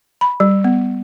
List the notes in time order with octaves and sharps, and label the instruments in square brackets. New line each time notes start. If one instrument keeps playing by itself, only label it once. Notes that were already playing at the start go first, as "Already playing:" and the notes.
[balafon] B5
G3
B3